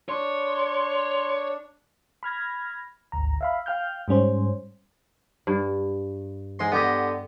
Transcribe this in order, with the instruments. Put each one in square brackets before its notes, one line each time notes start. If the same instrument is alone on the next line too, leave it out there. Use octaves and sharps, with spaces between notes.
[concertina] D4 [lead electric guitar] C#5 [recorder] C6
[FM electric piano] B5 F6 G#6 A#6
G#1 D2 A#5
E5 F5 B5
F5 G5 F6 G6
G#2 G3 C#4 C5
[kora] G2
[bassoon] G#2 [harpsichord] G#3 C6
[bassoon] D3 [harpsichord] B3 G4 D#5